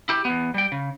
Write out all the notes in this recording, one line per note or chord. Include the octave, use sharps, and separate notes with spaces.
E4 G4
E2 B3
G3 G5
C#3